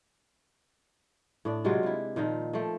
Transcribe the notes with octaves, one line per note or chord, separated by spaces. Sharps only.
A2 D4 D5
C3 F#3 G#3 F4
C3 E4
A#2 D#3 F3 D#4
F3 A3